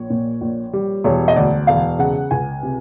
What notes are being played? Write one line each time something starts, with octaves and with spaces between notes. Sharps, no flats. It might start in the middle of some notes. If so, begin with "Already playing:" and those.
Already playing: A#1 C#5
A#2
A#1
G3
E1 C#5
D#5
D2 D5
E1 F5
C#3 F#5
C#2 G#5
C3